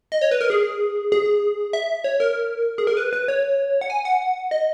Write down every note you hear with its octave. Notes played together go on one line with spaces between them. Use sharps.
D#5
C#5
B4
A#4
G#4
G#4
E5
C#5
A#4
G#4
A#4
B4
B4
C#5
F#5
G#5
F#5
D#5